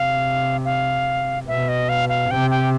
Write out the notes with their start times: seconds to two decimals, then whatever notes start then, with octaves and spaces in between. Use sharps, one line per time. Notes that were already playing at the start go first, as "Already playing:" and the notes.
Already playing: C3 F5
0.65 F5
1.48 B2 E5
1.68 D#5
1.89 F5
2.09 F5
2.30 C3 G5
2.51 G5